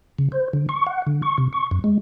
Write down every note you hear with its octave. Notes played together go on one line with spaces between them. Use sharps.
C#3
C5
D3
C#6
F#5
D3
C#6
C3
C#6
F#2
G#3